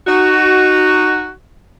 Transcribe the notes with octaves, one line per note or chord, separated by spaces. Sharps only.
D#4 F#4